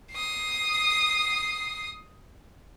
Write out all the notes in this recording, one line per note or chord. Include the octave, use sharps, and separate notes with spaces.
D#6 C7